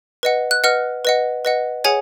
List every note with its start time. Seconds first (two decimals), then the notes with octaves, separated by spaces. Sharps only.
0.23 B4 D#5 F#5
0.51 F#6
0.64 B4 D#5 F#5 F6
1.05 B4 D#5 F#5
1.45 B4 D#5 F#5
1.84 G#4 C#5 F#5 G#5